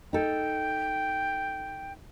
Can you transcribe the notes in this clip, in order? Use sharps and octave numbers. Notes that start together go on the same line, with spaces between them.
D#4 A4 G5